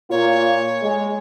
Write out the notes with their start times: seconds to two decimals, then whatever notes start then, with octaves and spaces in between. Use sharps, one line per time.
0.11 A#2 A#3 F4 C#5
0.82 G#3